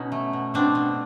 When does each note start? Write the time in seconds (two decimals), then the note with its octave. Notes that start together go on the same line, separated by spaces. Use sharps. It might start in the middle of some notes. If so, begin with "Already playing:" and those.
Already playing: B2 C#4 D#4
0.12 A3
0.33 B2
0.54 B2 C4 D4
0.75 B2